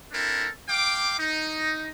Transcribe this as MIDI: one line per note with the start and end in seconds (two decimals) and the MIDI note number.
0.12 0.48 60
0.12 0.48 62
0.12 0.48 64
0.12 0.48 69
0.12 0.48 70
0.69 1.18 77
0.69 1.18 79
0.69 1.18 86
1.19 1.89 63